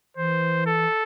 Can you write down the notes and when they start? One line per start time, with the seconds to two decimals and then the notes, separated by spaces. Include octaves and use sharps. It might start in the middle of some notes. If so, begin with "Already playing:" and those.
0.17 E3 C5
0.66 A4